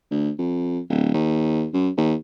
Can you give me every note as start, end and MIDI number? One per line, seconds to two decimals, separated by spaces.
0.11 0.31 38
0.39 0.80 41
0.90 1.13 26
1.14 1.67 39
1.74 1.90 42
1.98 2.15 39